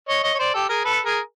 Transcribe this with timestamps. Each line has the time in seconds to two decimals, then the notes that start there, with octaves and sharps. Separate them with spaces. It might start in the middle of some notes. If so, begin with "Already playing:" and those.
0.09 C#5 D#5
0.24 C#5 D#5
0.34 C#5
0.39 C5 D5
0.54 G4 A4
0.69 G#4 A#4
0.85 A4 B4
1.05 G#4 A#4